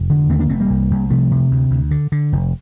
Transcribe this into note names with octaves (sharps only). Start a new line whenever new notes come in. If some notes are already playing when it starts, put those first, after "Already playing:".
Already playing: F1
D3
D#2 A3 C4
A#3 D4
F1 A3 C4
G3 A#3
C2
C2
C3 F3 A3
C3
D2
D2
D3
D3
F1